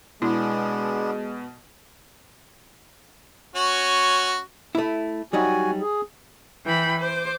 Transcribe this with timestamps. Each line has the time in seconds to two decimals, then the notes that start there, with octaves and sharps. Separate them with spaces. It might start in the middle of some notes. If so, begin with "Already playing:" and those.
0.22 B2 G#3 B3 D4 E4
3.55 C#4 F#4
4.75 A3 E4
5.33 F#3 G3 D#4 F#4 G#5
5.81 G#4
6.65 E3 G5 B5
6.99 C5 D6